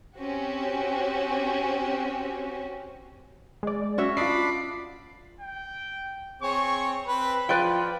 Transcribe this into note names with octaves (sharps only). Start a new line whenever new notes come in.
C4 C#4 F#4 G4
G#3 D5
C#4 F#4 E5
D4 F4 D#5 B5 D6 C7
G5
C4 G#4 C#5 C#6
C4 B4 B5
F3 F4 B4 D5 G5